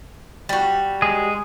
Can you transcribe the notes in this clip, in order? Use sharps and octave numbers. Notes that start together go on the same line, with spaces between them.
G3 F#4
G#3 G#4